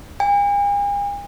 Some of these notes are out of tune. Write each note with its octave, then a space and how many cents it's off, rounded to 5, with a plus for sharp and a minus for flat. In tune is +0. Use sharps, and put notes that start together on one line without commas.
G#5 -45